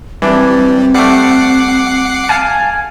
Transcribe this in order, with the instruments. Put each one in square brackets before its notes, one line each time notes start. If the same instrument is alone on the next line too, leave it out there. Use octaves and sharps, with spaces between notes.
[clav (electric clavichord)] E3 D4 [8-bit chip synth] G3 [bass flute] C4
[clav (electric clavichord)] G3 A3 [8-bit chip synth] F#5 D6 C7
[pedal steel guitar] F5 G#5 A5